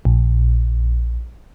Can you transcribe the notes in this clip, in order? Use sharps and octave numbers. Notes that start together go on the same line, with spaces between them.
A#1